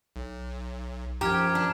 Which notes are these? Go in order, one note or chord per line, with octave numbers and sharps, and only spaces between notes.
B1
F#2 F3 G4 A#5 F6 G#6
D4